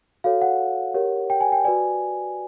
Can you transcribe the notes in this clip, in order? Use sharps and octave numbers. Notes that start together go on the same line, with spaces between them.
F#4 A4 C#5 F5
F#5
G4 A#4 C#5
G5
G#5
G5
F#4 B4 D5 G#5